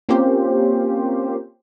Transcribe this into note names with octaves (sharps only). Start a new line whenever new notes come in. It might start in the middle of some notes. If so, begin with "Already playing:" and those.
A#3 C4 C#4 F4 G4 C5